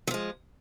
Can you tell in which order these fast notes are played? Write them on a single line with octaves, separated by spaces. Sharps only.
F#3 F3 G#3